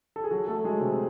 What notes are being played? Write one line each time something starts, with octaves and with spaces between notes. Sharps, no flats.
A4
G#4
F#3 F#4
A3 A4
F#3 G#3 G#4
C3 C4